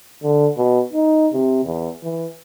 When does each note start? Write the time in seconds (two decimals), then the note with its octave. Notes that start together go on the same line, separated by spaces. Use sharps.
0.22 D3
0.57 B2
0.93 D#4
1.33 C3
1.65 E2
2.03 E3